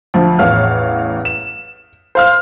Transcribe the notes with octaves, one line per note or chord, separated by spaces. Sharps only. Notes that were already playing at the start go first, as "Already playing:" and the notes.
D2 F3
A1 E2 C#5 F5 F6
E7
C5 F5 F6